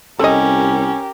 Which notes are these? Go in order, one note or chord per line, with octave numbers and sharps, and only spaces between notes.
C2 C#4 G4 A4 A#4 D#5